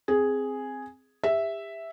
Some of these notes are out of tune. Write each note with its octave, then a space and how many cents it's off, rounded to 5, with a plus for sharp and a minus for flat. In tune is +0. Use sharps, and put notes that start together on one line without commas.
C4 +0 G#4 +0
G4 +40 E5 +0